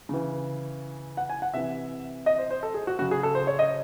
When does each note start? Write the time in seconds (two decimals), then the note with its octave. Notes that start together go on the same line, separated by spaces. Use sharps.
0.09 C#3 E3
1.17 F#5
1.30 G#5
1.42 F#5
1.54 C3 E3 E5
2.26 D#5
2.38 C5
2.50 C5
2.63 A4
2.74 G#4
2.87 F#4
2.99 C#3 F#3 F#4
3.11 G#4
3.23 A4
3.35 C5
3.47 C#5
3.59 D#5